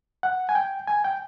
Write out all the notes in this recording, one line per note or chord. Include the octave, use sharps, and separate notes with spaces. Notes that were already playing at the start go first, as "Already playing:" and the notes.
F#5
G#5
G5
G#5
G5